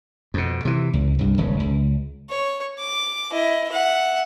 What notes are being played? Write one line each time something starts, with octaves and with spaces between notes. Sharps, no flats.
F2 B2
C3 E3
C#2
C2 G2
D#1 G#1 C#3
C#2
C#5
D6
E4 D#5
E5 F#5